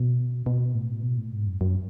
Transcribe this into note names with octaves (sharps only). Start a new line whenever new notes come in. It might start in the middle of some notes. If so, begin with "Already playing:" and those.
Already playing: B2
B2
A2
B2
A2
G#2
F#2
F#2